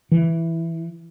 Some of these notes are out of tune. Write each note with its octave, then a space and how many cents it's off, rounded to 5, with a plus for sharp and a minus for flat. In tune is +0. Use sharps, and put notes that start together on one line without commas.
E3 +5